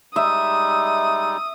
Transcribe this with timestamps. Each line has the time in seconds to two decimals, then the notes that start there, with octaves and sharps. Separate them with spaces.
0.16 G3 G#3 D#4 E5 D#6